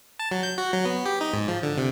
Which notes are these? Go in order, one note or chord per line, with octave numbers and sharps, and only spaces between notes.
A5
F#3
G6
F#4
F#3
B3
G4
D#4
G#2
F3
D3
C3